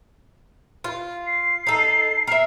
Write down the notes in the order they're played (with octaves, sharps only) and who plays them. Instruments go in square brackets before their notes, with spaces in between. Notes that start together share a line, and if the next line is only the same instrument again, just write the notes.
[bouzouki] F4
[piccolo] C7
[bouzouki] D#4 A4
A#4 E5